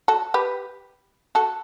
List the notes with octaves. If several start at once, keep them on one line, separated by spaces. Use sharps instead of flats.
F#4 A4
G4 B4
F#4 A4